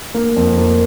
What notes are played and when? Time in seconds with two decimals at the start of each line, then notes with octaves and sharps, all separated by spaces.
0.14 A#3
0.36 F2
0.57 A#3